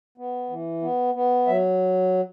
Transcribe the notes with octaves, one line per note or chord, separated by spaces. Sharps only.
B3
E3
B3
B3
F#3 E5